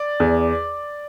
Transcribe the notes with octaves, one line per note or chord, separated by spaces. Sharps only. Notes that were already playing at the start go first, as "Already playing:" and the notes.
Already playing: D5
E2